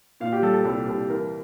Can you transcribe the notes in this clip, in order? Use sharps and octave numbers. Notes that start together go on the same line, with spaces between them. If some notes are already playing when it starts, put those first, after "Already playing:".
A#2 F5
G4
G3 A4
A4
C2 A4
C2
E3 A#4